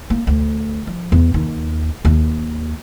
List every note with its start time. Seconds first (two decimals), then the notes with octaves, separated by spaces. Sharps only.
0.10 A#3
0.27 D2
0.87 F3
1.12 E2
1.34 D#2
2.05 D#2